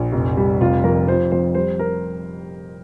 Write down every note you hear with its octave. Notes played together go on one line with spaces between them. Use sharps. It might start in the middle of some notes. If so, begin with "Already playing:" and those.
Already playing: A#1
F1
G3
F1 F4
F2 A#4
F3 C5
F2 C5
G3 C5
A#4